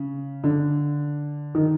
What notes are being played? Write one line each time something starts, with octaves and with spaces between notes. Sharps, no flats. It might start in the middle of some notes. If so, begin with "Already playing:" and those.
Already playing: C#3
D3
D#3